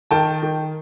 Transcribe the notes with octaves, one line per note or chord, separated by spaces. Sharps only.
D#3 G5 A5
D#3